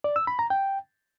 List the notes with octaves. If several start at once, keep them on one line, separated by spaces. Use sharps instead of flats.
D5
E6
B5
A#5
G5